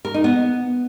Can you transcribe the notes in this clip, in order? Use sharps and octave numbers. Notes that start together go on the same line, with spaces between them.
A#4
D#4
B3